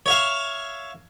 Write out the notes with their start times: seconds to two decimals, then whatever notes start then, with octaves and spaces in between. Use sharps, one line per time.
0.06 C#5 E5 F5